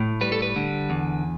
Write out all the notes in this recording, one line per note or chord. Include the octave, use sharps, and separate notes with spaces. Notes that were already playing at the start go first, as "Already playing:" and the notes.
Already playing: A2
G3 B4
A4
B4
D3
E2